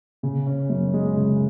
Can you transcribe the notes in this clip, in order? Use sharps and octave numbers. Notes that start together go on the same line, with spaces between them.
C#3
C#4
F#2
G#3
C#3